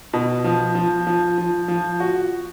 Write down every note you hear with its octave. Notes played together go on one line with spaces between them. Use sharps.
B2
F3
F3
F3
F3
F3
F#4